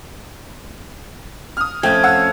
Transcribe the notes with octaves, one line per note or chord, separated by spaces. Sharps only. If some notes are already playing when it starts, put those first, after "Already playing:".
D#6 F6
F2 A3 C#4 G5 G#6
F5 F#5 E6